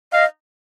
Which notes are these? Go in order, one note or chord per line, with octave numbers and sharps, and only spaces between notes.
D#5 F5